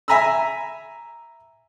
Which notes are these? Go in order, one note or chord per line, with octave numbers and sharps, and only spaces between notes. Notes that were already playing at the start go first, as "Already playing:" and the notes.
E5 G#5 A#5 B5 E6